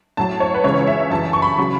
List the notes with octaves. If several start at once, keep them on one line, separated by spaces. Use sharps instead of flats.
A2 F#3 A5
C#5
B4
C#2 C#3 E3 C#5
E5
F#2 E3 A5
C#6
B5
C#3 F#3